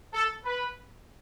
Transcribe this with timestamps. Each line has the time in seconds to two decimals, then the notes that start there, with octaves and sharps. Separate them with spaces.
0.13 A4
0.45 B4